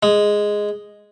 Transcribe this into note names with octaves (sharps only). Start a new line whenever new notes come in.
G#3